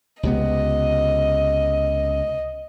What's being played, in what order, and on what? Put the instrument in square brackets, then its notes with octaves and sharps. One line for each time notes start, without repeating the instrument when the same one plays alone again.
[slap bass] C#2 C3 B3 [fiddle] D#5